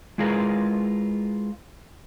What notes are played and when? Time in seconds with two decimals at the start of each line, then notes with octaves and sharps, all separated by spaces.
0.18 G#3 E4 F4 G#4 A#4 B4